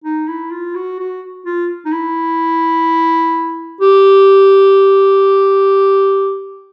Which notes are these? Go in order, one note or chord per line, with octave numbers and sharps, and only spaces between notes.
D#4
E4
F4
F#4
F#4
F4
D#4
E4
G4